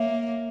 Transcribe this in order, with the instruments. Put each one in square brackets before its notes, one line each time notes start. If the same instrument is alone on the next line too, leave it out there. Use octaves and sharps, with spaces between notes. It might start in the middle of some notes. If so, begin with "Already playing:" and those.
Already playing: [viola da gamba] A#3 [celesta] C#5 E5